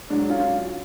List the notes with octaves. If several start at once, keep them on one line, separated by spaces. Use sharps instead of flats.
G#2 F#3 D4 F#4
C#4 F4